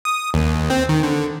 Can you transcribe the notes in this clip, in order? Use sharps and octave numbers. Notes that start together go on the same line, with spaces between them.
D#6
D#2
C4
D#3
D3